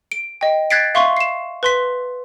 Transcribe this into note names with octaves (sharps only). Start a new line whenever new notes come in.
D7
D#5 G5
F#6 G#6 A6 B6 C7 D7
E5 F5 C6 C#6
C7 E7
B4 C6 B6